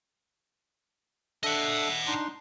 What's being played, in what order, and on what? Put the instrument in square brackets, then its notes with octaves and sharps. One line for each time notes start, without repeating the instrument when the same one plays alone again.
[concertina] D4 A4 E5 [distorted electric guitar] D#5 F#5
[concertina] D4 D#4 C6